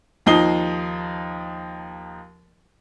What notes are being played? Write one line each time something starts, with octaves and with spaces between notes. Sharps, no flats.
D#2 F3 D#4 D#6 C7 G7